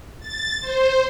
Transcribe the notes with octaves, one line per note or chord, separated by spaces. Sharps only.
A6
C5